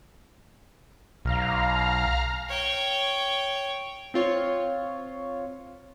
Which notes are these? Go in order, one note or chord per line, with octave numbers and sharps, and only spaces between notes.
B1 F5 A#5 F6
C#5 G5
C4 F4 C#5